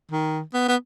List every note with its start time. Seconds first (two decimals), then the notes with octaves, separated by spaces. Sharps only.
0.11 D#3
0.54 B3
0.68 B3